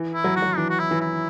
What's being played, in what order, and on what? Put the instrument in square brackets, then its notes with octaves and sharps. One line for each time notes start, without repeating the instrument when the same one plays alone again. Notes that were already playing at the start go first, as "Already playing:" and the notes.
Already playing: [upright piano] E3
[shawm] E4
[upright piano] F#3
[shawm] F#4
[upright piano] F#3
[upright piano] E3 [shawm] D4
[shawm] F#4
E4
[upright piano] E3
[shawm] E4